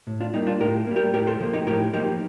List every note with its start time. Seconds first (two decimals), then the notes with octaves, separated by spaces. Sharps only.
0.07 A2
0.20 D4 F4
0.34 G3 A#3 D#4
0.47 D4 F4
0.60 A2 G4 A#4
0.87 G3 A#3
0.96 G4 A#4
1.13 A2 G4 A#4
1.27 A4 C5
1.40 F3 A#3
1.53 D#4 G4
1.66 A2 G4 A#4
1.93 F3 A#3 D#4 G4